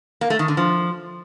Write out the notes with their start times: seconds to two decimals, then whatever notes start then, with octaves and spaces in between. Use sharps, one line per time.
0.21 A#3
0.30 A3
0.39 D#3
0.48 D3
0.57 F3